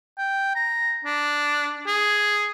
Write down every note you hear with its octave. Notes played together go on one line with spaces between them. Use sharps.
G5
A#5
D4
G#4